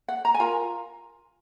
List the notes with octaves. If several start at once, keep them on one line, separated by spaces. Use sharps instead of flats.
F#5
A#5
G#5
F4 A#4 A#5